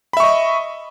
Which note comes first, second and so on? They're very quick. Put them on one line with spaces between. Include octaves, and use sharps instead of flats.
B5 E5 C#6 D#5